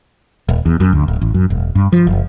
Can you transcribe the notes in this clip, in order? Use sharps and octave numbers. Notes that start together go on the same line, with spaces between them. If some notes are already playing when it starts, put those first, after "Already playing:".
D#1
E2
F#2
D2
D1
A1
F#2
E1
G2
F3
F#1